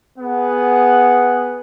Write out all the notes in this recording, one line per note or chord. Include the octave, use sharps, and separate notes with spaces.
B3 G#4 F#5